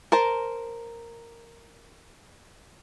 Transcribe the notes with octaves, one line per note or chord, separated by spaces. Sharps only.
A#4 C5 A5